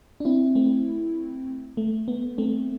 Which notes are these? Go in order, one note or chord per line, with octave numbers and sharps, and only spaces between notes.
D4
C4 E4
A3 C4
A3
B3
A3 C4